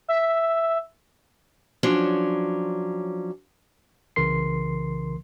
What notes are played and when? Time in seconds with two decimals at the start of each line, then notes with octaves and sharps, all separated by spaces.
0.08 E5
1.83 F3 F#3 C#4 D4
4.16 C2 C#3 E3 A#4 C6 C7